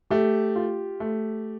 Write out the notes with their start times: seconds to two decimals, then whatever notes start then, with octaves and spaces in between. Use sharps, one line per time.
0.11 A3 G4
0.56 F4
1.00 A3